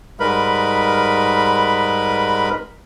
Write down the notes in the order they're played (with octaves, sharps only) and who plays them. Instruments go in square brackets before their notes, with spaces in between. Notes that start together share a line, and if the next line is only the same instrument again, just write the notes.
[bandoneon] G#2 G3 G#3 A#4 B4 B5